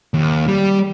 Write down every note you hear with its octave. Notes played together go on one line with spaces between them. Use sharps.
D#2
G3